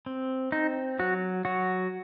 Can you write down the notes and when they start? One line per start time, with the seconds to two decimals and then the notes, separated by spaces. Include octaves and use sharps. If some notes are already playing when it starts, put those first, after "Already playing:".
0.06 C4
0.52 C4 D#4
0.99 F#3 F#4
1.45 F#3 F#4